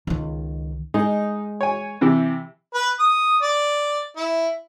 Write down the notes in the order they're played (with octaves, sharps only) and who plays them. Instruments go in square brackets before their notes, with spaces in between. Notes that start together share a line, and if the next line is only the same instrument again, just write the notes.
[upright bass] C#2 D#3
[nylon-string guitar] G#3 [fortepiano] D#4
[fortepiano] C#5 G#5
C3 E3 G4
[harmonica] B4
D#6
D5
E4